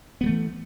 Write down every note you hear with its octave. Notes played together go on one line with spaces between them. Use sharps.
E3 F3 A3 B3